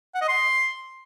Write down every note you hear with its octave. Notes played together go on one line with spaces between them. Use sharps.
F#5
D#5
C6